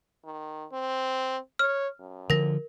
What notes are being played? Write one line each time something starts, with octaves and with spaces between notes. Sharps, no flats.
D#3
C4
C#5 F6
F#2
D3 F3 A#4 A#6